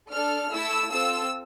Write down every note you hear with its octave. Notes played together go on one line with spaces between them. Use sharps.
D4 A4 F6
A3 E4 A4 E6
C4 F4 A4 E6